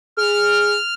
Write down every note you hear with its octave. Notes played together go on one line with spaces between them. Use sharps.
G#4 F6